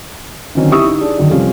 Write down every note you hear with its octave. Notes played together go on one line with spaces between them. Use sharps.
D3 D#3 F#3 C4 C#4 D#4
E4 G4 E5 C#6 D#6 E6
D#4
D4 G#4
F#2 D3 D#3
C3 F3 G3 C#4 F4 A4